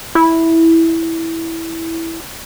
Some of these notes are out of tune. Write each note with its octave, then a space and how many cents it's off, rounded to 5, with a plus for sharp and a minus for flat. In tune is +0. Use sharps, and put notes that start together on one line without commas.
E4 -5